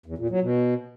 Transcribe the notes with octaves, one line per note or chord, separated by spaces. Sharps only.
E2
A#2
F#3
B2